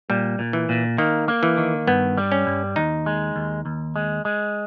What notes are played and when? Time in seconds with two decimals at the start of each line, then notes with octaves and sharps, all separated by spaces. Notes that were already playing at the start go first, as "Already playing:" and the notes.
0.10 A#2 G3
0.39 A#2
0.53 E3
0.69 A#2
0.98 D#3 A#3
1.28 A#3
1.43 E3
1.58 D#3
1.87 G2 B3
2.18 G3
2.32 C#4
2.47 G2
2.76 D#2 D#4
3.06 G#3
3.36 D#2
3.66 D#2
3.96 G#3
4.25 G#3